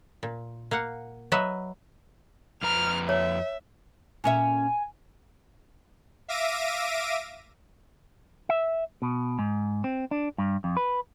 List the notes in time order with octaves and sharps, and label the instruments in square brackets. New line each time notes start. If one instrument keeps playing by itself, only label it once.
[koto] A#2
A#3 F5 F#5
F#3 B4 D#5 E5
[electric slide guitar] F2 B4 A#5 [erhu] F6
[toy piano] C#5 [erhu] E5
[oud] A#2 C#4 E5 [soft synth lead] G#5
[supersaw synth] E5 F5 D6 A#6 D7 D#7
[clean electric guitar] E5
B2
G#2
C4
D4
G2
F2
B4